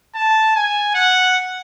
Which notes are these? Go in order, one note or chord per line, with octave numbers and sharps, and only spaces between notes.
A5
G#5
F#5